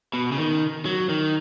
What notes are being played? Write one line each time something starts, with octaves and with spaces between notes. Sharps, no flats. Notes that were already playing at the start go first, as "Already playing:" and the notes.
B2
C#3
D#3
F#3
D#3